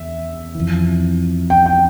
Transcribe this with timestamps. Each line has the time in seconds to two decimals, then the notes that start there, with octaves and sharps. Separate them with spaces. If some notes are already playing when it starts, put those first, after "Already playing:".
Already playing: E2 E5
0.55 F2 E3
1.50 G5
1.66 G5